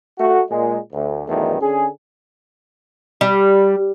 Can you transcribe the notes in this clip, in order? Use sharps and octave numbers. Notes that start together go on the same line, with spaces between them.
A3 F#4
A#2 G#3
D2
B1 E2 G2 D#3 A3
D3 C#4 G#4
G3